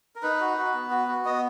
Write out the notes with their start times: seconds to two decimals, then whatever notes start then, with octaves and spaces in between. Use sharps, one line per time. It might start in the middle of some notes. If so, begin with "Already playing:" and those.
0.16 A#4
0.22 D#4 B4
0.40 F#4
0.57 F#4
0.74 B3
0.90 F#4
1.08 F#4
1.25 B3 D#5